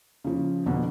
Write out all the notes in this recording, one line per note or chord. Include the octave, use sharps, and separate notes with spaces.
C#3 F3
F2 B2 D3